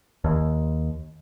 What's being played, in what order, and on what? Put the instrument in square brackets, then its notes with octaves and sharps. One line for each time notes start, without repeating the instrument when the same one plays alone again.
[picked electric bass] D#2